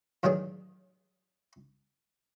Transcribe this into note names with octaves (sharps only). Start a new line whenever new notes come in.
A2 D#3 E3 F#3 D4 G#4